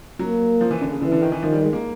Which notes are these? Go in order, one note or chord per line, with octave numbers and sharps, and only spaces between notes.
F#3 A#3
F3
E3
D3
C#3
D3 E3
D3
D#3
E3
D#3 F3
G3
G#3
A#3